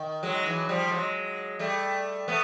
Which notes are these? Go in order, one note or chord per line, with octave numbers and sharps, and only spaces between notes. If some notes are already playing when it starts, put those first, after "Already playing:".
Already playing: D#3
F#3 G#3
E3 F#3
F3 G3
F#3 G#3
G3 A3
A3 B3